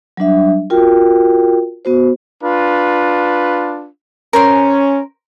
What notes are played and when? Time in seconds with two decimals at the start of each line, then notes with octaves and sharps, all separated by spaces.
0.17 F#3 G3 D4 E5
0.70 F4 F#4 A#4 G5
1.85 B3 F#4 C5
2.42 D4 F4 B4
4.33 C#4 A#4 C5 C6